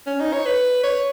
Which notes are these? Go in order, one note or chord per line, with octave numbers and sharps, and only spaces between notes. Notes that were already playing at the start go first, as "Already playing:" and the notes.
C#4
D#4
C#5
B4
C#5